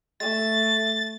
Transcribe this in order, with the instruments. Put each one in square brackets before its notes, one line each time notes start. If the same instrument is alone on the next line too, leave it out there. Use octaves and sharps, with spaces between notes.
[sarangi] A3 [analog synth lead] A6